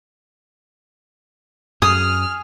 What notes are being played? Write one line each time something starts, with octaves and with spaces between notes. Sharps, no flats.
F#2 G#4 D#6 F6